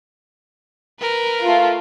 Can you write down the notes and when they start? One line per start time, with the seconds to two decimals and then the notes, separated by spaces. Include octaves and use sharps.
1.00 A#4 B4
1.42 A3 F4